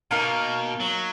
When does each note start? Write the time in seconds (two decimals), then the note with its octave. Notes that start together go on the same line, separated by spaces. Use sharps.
0.11 B2 A#3 D#4 A#4 F5
0.80 F#3